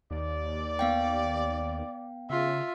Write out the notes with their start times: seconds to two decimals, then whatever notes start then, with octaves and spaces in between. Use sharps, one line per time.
0.11 D#2 D5
0.79 B3 F5 G5
2.30 C#3 F4 E5